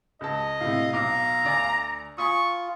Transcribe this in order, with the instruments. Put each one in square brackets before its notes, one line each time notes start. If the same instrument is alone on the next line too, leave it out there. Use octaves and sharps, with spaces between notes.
[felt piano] C#2 A5 [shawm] D#5
[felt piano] A2 C3 [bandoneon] F5
[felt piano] B1 D6 [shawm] A#5
[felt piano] D2 D5 G#5
[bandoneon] F4 [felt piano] G#5 B5 D#6 [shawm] C#6